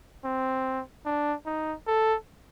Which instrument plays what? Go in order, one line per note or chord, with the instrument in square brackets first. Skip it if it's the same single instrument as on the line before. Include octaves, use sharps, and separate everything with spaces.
[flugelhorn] C4
D4
D#4
A4